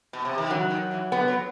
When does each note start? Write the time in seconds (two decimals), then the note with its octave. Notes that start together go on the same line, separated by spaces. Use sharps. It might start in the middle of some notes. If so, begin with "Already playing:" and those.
0.13 B2
0.25 C3
0.38 D#3
0.50 E3 F#3
0.70 D#3
0.91 E3
1.12 G3 B3
1.28 F#3